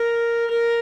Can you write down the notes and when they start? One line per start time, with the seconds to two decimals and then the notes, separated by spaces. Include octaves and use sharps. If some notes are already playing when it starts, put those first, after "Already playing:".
Already playing: A#4
0.50 A#4